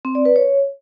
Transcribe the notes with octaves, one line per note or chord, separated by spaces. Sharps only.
C4
D5
B4
C#5